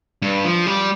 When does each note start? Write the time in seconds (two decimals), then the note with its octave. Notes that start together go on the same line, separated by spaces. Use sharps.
0.22 G2
0.44 F3
0.66 G3